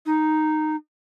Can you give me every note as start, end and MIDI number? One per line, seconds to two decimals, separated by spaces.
0.06 0.76 63